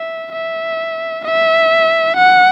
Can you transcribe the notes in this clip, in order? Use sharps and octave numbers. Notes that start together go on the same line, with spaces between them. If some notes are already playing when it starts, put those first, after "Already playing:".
Already playing: E5
E5
E5
F#5